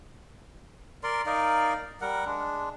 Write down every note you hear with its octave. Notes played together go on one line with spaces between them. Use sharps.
A#4 D5 C6
D#4 A#4 D5 F5
G3 A#4 F#5
G#3 D4